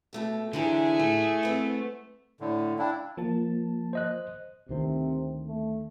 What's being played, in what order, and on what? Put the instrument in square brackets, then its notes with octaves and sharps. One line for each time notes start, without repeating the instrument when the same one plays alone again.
[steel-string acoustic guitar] B2 A3 G4
[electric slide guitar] D3 [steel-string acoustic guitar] E3 F#3 G4 [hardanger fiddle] G#4 E5
[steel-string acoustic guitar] A2 [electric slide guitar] A3
[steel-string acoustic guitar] B3 C4
[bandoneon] A2 D3
[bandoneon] D4 E4 [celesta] F5 G5
[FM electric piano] F3 A#3 A5
[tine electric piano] C5 D#5 F#6
[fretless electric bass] D2 D#3 C4 [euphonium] C3
[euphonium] A3